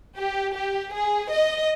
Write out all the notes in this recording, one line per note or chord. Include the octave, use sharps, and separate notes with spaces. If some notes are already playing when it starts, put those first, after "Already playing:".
G4
G4
G#4
D#5